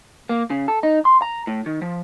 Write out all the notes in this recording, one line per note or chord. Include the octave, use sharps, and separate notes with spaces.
A#3
C#3
A4
D#4
C6
A#5
A2
D#3
F3